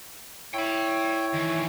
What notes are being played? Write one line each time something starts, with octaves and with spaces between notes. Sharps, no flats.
E4 C#5 G5 B5
D#3 E3